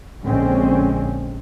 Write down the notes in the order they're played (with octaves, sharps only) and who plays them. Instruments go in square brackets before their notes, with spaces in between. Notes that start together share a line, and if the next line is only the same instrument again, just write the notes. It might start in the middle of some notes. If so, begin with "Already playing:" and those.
[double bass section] A#1 D3 G#3 C4 C#4